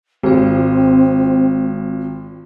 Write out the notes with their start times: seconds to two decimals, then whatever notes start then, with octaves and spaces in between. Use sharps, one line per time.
0.23 G#1 G#3 C4 F4